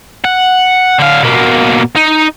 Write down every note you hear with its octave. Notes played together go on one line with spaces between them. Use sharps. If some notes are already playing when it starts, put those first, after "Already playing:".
F#5
D3 F5
B2 A#3
D#4